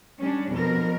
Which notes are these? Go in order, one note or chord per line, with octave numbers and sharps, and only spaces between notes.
G3 C#4 D4
F2 B2 A#4